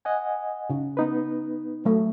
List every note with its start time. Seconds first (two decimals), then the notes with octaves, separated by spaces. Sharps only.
0.05 D#5 F#5 G#5
0.70 C#3
0.97 B3 D#4 B4
1.85 F#3 A3